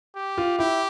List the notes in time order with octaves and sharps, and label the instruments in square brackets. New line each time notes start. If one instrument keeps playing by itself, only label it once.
[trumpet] G4
[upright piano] F4
[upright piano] E4 [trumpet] G4